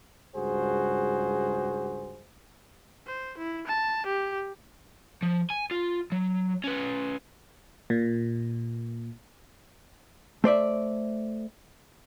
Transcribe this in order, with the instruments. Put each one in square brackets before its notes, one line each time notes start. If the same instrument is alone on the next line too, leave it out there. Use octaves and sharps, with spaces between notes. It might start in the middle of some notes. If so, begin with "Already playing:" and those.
[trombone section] C#2 G2 F#4 G#4 C5
[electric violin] C5
E4
A5
G4
[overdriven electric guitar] F3
G#5
F4
F#3
C#4 B4
[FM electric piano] A#2
[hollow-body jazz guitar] A3 C5 D5 E5